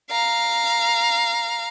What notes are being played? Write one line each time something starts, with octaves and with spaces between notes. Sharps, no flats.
F5 A#5